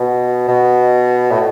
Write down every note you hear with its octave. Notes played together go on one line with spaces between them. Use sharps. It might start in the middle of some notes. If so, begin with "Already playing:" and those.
Already playing: B2
B2
A2